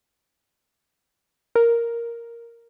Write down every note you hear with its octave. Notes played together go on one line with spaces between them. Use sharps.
A#4